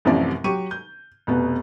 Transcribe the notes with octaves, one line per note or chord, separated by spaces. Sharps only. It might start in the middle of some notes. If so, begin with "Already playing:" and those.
A1 F#2 C3 E3 F3 D5
F#3 G4 C#6 D#7
G6
F1 B2 B3